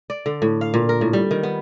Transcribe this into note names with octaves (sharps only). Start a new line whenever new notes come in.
D5
D3
A2
F5
A#2
A#4
A2
G3
D#3
B3